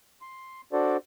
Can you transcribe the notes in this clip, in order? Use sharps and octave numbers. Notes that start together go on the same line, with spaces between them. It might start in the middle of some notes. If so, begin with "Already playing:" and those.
C6
D4 F#4 A4 C5 D5